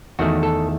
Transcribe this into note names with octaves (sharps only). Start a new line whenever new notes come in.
E2 D#3 A3 F#4
A4